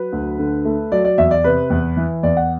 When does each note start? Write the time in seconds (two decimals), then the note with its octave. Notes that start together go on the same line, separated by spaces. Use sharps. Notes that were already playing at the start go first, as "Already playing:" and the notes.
Already playing: F#3 B4
0.12 D2
0.39 D3
0.65 A3
0.92 F#3 D5
1.05 D5
1.18 E2 E5
1.31 D5
1.44 C3 B4
1.70 E2
1.97 E3
2.23 E2 D5
2.37 F#5